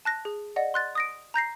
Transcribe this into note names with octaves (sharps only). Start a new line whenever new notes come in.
A5 F#6 A#6
G#4
D5 D#5 F#5
C6 F#6 A6
D#6 A#6 D7
A#5 G6 A#6 C7